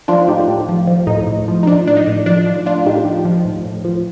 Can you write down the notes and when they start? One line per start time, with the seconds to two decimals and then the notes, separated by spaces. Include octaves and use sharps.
0.08 F3 D4 F4
0.28 A2 D#4 G4
0.48 A2
0.69 F3
0.87 F3
1.07 A2 D#4
1.27 A2
1.48 F3
1.63 D#4
1.67 F3 D4
1.87 A2 D4
1.97 D#4
2.07 A2
2.26 F3 D4
2.46 F3
2.66 A2 D4 F4
2.86 A2 D#4 G4
3.05 F3
3.25 F3
3.45 A2
3.65 A2
3.85 F3